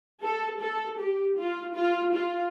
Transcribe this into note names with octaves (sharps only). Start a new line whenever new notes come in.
A4
A4
G4
F4
F4
F4